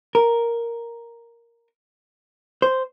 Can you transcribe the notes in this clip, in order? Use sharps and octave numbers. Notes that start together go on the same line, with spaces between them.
A#4
C5